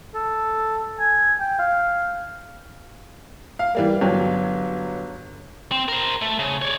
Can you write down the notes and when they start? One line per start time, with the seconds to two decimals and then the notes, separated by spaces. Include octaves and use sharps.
0.15 A4
0.99 G#5
1.40 G5
1.59 F5
3.59 F5
3.75 E3 G3 A#3
4.01 G1 F#3
5.72 C4
5.88 A#4 C5
6.22 A3
6.39 C#3
6.62 C#5 D5